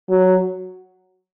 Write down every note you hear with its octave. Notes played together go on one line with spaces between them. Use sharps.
F#3